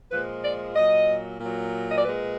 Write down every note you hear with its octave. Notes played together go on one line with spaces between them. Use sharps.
A#2 F3 G#3 B4
D5
A#2 F#3 D#5
A#2 F#3
D#5
D5
A#2 G#3 B4